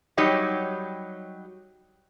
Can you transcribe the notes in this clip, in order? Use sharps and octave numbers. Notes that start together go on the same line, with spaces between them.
F#3 G3 D#4 G4 C#5 D#5